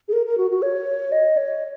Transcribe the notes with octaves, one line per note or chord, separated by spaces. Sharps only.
G#4
A#4
A#4
F#4
F#4
C#5
D#5
C#5